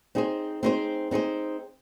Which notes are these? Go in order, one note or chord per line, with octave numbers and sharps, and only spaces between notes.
C4 D#4 G#4 C5
C4 D#4 G#4 C5
C4 D#4 G#4 C5